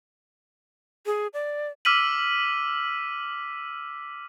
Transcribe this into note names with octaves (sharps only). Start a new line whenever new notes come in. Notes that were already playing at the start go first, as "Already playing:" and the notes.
G#4
D5
D6 E6 F6 B6 D#7 F#7